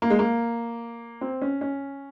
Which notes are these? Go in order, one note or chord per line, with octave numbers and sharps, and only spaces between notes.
A#3
G#3
A#3
C4
C#4
C#4